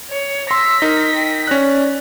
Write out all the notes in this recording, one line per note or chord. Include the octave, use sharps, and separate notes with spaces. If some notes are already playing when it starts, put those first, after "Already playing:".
C#5
C6 E6 A#6 B6
D#4 A#4
G5
C#4 D5 F#6